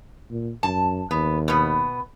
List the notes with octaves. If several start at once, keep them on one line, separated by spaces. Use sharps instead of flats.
A#2
F#2 A5
D#2 B3
B2 B3